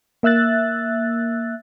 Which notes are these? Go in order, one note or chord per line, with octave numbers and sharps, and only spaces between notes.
A#3 E5 E6 F#6 A6